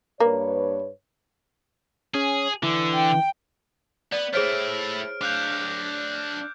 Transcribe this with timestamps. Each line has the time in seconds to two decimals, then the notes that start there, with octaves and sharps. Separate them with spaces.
0.20 G2 A#3 B4 C#5
2.14 C#4 G#4
2.63 D3 E3
2.94 G5
4.12 B3 D5
4.33 A3 E4 G#4 C5 C#5 F6 D7
5.21 D4 F5 D6 F#6 G6